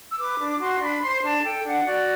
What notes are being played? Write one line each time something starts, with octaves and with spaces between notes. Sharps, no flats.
E6
B4 D6
D4
F#4 C6
D4 B5
C5 C6
D4 A5
A4 G5
D4 F#5
F#4 D5